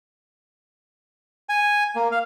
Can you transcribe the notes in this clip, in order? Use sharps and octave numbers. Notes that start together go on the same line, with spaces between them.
G#5
A#3
F5